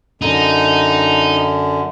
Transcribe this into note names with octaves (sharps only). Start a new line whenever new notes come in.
F#2 D3 D#4